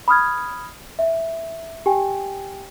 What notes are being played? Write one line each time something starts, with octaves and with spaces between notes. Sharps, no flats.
B5 D#6 F6 G#6
E5
G4 G5 G#5